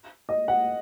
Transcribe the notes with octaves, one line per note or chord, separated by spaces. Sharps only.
D#5
F#5